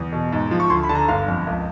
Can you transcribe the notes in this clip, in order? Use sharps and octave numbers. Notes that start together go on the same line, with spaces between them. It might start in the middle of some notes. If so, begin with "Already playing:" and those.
Already playing: E2
B2
G#2
F3
C#6
D2 C6
B5
D3 A5
A#5
G1 F5
F2
C#2